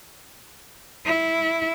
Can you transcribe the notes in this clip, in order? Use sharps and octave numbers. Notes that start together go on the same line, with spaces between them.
E4